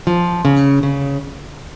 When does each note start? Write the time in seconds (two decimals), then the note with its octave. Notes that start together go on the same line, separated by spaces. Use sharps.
0.07 F3
0.45 C#3
0.83 C#3